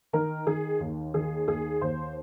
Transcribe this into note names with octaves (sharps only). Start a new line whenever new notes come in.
D#3 A#4
D#3 G#4
D#2
D#3 G#4
D#2 G#4
D#2 C5